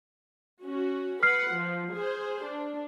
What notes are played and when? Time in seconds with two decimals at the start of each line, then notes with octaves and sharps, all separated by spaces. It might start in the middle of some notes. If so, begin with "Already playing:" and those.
0.63 C#4 F#4
1.23 B4 F#5 F6 C7
1.54 F3
1.94 G#4 C5
2.44 D4